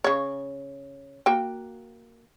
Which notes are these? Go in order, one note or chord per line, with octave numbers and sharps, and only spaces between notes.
C#3 C#5
A#3 F#4 G5